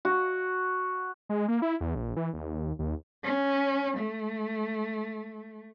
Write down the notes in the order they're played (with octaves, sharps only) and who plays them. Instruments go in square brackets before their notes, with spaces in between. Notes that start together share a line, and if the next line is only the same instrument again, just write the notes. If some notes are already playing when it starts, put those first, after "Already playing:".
[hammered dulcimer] F#4
[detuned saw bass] G#3
A#3
E4
E2
A#1
E3
D#2
D#2
[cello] C#4
A3